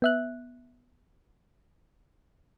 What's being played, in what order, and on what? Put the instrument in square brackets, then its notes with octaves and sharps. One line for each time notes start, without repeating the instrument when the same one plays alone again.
[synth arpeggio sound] B3 E5 F#6